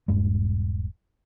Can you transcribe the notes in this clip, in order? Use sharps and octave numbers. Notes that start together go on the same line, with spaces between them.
D#1 G2 G#3